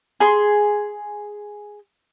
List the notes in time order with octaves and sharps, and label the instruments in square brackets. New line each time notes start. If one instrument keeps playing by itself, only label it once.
[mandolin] G#4 C6